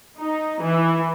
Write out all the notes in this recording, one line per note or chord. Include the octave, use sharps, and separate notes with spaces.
D#4
E3